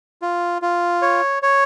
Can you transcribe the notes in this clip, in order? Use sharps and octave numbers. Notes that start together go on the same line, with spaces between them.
F4
F4
C#5
C#5